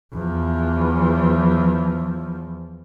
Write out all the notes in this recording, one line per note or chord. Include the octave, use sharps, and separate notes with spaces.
E2 F3